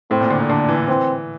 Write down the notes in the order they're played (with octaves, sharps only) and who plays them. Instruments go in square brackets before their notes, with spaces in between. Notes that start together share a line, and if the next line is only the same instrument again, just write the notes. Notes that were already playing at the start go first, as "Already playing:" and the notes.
[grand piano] A2 [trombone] C4
[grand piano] A#2
D3
A#2
[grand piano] D3 [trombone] D4
[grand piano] E3
[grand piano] E3 [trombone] C4